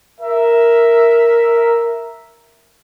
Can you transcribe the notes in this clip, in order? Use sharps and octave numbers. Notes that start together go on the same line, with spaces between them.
A#4 E5